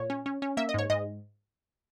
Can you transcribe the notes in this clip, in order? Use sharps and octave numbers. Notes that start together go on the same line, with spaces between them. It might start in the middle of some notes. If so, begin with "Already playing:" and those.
Already playing: A#2 C#5
C#4
C#4
C#4
A#3 E5
D#5
G#2 C#5
G#2 D#5